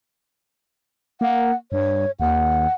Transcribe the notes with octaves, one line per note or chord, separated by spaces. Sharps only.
A#3 F#5
G2 C#5
D#2 F#5